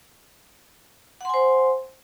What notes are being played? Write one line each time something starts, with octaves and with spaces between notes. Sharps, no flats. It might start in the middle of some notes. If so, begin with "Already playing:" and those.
C5 F#5 G#5 C6